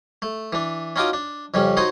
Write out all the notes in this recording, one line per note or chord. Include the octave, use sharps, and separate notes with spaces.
A3
E3 D4
C#4 D#4 F4 F#4 D6 D#6
D4
F2 C#3 G3 C#4
D#4 F#4 C5 C#5 D#5